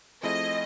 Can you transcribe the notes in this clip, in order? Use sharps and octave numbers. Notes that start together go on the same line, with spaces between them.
F3 A3 C4 E4 G#4 D#5